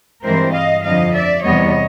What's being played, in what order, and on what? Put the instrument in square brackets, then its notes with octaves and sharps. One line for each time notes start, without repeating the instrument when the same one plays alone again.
[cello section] G2 E3 G#3 C4 A#4 C5
D#5 F5
F2 D3 F3 D#5 F5
D5 E5
E2 C3 E3 G3 B3 C#5 D#5